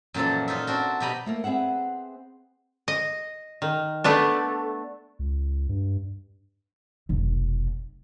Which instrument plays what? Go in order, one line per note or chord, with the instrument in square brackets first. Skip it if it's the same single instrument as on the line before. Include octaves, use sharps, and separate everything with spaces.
[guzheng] F#2 A#2 E3 F3 A4
C#4 D#4 F4 E5
C4 D4 F#4
B2 D4 G4 D#5 A#5 B5
[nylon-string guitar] A3 A#3 A#4
B3 C4 G#4 E5 F#5
[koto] D#5
D#3
A3 B3 D4
[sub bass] C#2
G2
[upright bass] F1 B1